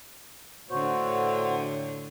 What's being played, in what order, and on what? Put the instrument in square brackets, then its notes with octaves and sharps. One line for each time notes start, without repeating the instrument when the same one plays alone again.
[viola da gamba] A2 D3 [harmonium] F#4 C5 C#5